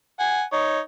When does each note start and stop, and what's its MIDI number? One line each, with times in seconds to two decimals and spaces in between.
0.19 0.42 78
0.19 0.42 80
0.52 0.79 63
0.52 0.79 73